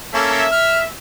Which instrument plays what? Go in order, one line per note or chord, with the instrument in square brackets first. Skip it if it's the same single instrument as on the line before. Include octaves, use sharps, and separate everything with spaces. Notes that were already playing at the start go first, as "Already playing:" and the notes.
[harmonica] A#3 C#4 A4 [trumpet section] E5
[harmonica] F6